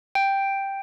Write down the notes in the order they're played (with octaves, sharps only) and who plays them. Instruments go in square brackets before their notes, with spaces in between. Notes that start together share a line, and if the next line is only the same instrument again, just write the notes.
[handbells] G5